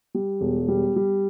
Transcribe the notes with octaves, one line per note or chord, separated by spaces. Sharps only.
G3
E1
G3
G3